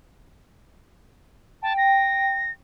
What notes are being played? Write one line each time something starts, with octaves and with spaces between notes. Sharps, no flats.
G5 A5
A#6